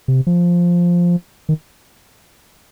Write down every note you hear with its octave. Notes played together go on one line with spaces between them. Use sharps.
C3
F3
D#3